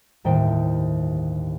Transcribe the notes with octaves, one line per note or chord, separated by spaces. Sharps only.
G1 D#2 A2 D#3 C5 G5